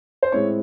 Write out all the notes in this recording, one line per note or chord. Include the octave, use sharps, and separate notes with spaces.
C5
A2 G#3 C4 E4 C#5